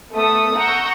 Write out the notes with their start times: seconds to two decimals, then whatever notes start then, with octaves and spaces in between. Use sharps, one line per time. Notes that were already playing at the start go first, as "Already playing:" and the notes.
0.11 A3 B3 A4 D#6
0.55 F#5 A#5 C#6 E6 G6 A#6